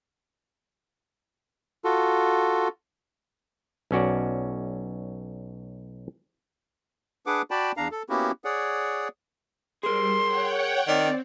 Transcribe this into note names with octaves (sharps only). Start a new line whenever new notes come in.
F4 F#4 A4
B1 C#4 F#4 D5
D4 G#4 B4 F#5 D6
F#4 D5 G5 A5 B5
E2 D4 F5 A#5
A4
A#3 B3 C#4 E4 F#4 G4
G#4 C#5 D5 F#5
G3 G#4 A#4 C6
C#5 F#5 G5
D#3 C4 D5